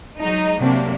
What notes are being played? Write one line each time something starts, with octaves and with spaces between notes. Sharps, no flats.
F#3 G#3 D#4
C3 F#3 A#3 D4